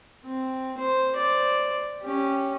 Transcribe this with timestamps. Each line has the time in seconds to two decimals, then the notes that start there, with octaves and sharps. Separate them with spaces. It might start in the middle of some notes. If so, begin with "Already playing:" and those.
0.25 C4
0.77 C5
1.15 C5 D5
2.02 C#4 G4